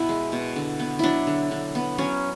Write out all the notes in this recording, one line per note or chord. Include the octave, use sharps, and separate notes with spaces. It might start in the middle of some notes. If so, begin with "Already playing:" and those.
Already playing: B2 B3 E4
G#3
B2
D3
B3
F#3 D4 E4
D3
D3
B3
F#3 C#4